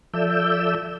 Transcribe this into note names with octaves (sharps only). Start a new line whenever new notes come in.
F3 A4 D5 E5 E6 G6